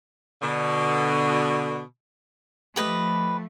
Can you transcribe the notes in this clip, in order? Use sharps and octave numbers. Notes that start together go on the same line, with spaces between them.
B2 D3
F3 A3 G4 B4 D#5